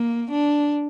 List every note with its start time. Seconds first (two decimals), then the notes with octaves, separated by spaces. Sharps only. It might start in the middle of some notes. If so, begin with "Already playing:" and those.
Already playing: A#3
0.31 D4